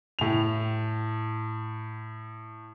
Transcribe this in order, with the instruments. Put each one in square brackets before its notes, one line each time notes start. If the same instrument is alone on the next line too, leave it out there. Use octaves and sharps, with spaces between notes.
[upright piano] A2 F7